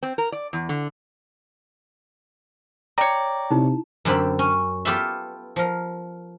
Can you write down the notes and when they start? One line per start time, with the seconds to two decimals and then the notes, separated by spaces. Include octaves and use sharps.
0.03 C4
0.18 A#4
0.32 D5
0.53 E2
0.69 D3
2.98 C#5 D5 G5 A#5
3.51 C3 D#4 E4
4.05 F#2 D3 C4 G4 B5
4.39 C#4
4.85 B3 F4 G4 A4 B4 E5
5.56 F3 A#4